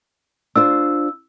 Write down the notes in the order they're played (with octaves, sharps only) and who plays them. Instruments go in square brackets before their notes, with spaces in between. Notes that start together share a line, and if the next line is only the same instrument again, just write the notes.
[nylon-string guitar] D4 F4 C5 [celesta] E6